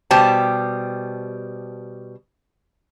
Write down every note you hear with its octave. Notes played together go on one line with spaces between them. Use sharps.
B2 G3 G4 C5 A5